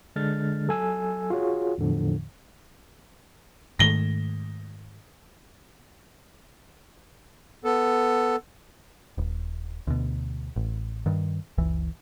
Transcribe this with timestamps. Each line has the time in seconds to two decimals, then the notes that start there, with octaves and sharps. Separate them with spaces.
0.16 D3 G#3 D4 F6 A6
0.68 F#3 A4 G#5 E6
1.30 F4 F#4 G#4 C#5
1.78 E2 A2 D3 F3
3.79 G#2 D#3 A3 A#6 G7
7.64 B3 A4
9.18 D#1
9.87 D2 B2
10.56 A1
11.06 G2 D#3
11.58 F#1 C#2 E3